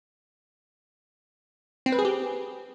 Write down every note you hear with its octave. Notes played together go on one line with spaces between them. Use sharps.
C4
B4
G#4
G4